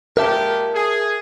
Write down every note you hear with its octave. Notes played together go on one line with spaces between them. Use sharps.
A#2 G#3 G4 A#4 E5 A5
G#4